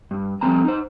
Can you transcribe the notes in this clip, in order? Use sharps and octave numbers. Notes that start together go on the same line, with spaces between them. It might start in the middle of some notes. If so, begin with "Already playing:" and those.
G2
F3 G3 A3 C4 G#5 A#5
D#4 C5